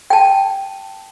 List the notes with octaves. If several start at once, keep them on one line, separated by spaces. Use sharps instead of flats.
G5 A5